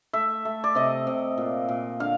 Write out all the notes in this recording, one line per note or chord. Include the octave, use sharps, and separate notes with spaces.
A3 E5
A3
D5
C3 D#5
C3
A#2
A#2
D3 F5